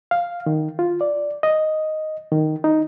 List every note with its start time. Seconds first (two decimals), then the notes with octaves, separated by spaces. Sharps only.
0.11 F5
0.46 D#3
0.79 F4
1.01 D5
1.43 D#5
2.32 D#3
2.64 D#4